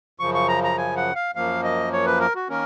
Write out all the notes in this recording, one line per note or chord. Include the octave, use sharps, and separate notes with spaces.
F#2 C#3 F3 C#6
C#6
A#5
A#5
G#5
F#5
F5
F#2 F3 A#3 F5
D#5
C#5
B4
A#4
F#4
D#3 A#3 C#4 A#4